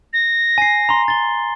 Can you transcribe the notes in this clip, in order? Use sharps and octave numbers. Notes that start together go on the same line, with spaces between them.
A#6
G#5 C7
A#5 C6
A6 G7